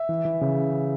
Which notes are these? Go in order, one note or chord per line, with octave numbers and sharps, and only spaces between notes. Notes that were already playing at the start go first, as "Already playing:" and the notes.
Already playing: E5
E3
E3
C#3